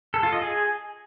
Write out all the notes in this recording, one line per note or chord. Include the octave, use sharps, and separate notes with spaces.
A4
F4
D#5
G#4